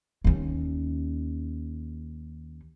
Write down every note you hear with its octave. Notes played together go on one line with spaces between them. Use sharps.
D#2 C#4